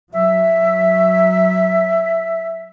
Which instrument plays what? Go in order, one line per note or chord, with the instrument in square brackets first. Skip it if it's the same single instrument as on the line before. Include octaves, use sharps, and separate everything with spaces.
[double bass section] F#3 [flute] E5